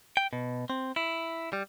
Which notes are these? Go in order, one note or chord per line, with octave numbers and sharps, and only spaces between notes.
G5
B2
C4
E4
G3